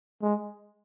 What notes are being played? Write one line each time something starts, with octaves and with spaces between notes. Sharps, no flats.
G#3